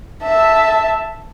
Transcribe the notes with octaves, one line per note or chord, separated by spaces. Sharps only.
E5 A5